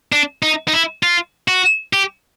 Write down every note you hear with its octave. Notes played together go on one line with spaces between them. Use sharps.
D4
D#4
D#4
E4
F4
F#4
G4